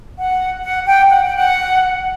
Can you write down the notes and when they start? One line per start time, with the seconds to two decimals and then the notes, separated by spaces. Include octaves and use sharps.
0.18 F#5
0.63 F#5
0.86 G5
1.09 F#5
1.24 G5
1.36 F#5